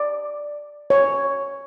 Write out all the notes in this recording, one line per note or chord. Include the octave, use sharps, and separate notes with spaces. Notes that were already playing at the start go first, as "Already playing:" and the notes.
Already playing: D5
C#5